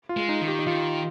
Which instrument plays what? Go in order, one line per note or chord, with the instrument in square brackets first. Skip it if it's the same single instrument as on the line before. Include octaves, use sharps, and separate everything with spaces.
[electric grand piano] F4
[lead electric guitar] G#3
[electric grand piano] D#4
[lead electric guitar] D#3
[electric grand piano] G4
D#4
[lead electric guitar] D#3 [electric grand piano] F4